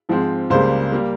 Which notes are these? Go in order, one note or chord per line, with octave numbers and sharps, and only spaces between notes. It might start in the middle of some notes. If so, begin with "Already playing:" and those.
G#2 F3 G#3 C4
C#2 C#3 G3 A#3 C5
G3 A#3